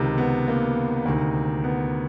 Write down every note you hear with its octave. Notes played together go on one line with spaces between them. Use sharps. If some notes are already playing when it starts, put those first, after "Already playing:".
Already playing: C#2 C3 D#3
B3
A#3
D2 C3 D#3
B3